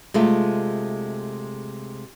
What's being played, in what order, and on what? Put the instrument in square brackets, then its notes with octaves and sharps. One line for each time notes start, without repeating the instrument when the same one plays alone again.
[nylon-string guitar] C3 G#3 A3 F4